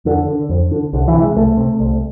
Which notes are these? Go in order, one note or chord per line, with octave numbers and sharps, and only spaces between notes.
F2 D3
D3
F2
D3
C2 D3
E3
C3
G#3
C2 A3
C3
C2